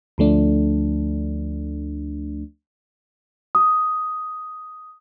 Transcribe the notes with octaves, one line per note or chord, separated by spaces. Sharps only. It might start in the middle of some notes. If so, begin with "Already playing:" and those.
D2 F3 A3 D4
D#6